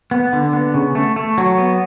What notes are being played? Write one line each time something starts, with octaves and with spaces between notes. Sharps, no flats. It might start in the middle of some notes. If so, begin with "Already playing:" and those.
B3
D3
B3
C#3
A3
A3
F#3
B3